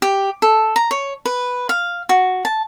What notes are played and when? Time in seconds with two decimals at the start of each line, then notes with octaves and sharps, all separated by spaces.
0.02 G4
0.42 A4
0.76 A#5
0.91 C#5
1.25 B4
1.69 F5
2.09 F#4
2.45 A5